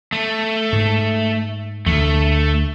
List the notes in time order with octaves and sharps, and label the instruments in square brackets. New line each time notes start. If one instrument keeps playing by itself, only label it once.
[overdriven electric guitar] A3
[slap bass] G#2
[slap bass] D2 [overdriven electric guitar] A3